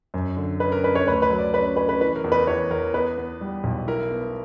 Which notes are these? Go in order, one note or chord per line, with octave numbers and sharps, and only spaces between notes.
F#2
D3
C#4 B4
A#4
C#4 B4
C#5
D2 B4
B4
F#3
D5
C#4 B4
C#4 B4
B4
E3 B4
A#4
E2
B4
E2 C#5
E2 A#4
B3 B4
B3
G3
B1
E4 A#4
B3